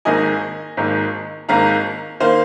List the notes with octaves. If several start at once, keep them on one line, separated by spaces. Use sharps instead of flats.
G#1 G#2 D#3 A#3 D#5 G#5
G#1 G#2 D#3 A#3
G#1 G#2 D#3 A#3 F5 A#5
D#3 A#3 C5 F5